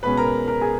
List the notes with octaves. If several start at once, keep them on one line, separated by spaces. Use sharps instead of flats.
B2 G#3 C#4 B4 B5
A#4 A#5
A#4 A#5
G#4 G#5